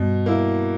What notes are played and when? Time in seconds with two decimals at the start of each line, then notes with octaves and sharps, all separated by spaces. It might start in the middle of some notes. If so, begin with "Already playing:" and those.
Already playing: G2 B2
0.26 A#3 E4